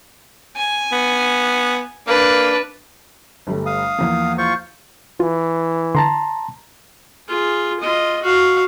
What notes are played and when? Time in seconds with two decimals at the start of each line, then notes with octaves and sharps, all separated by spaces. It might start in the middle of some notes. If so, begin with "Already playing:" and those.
0.56 G#5
0.92 B3
2.07 A#3 D4 B4
3.47 G1 G3 A3
3.66 F5 D#6
3.99 E2 F3 A#3
4.38 F4 C5 C#6
5.20 E3 F4
5.95 D3 A5 A#5 C6
7.28 F4 G#4
7.80 F4 D#5
8.23 F#4 F5